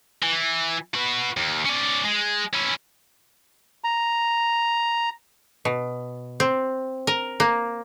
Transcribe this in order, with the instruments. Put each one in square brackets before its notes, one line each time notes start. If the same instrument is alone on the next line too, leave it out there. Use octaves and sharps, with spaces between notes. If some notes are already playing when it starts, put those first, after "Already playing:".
[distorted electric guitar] E3
F#4 B4
D#2
C#4 D5
G#3
C#4 E4
[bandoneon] A#5
[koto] B2
C4
A#4
A#3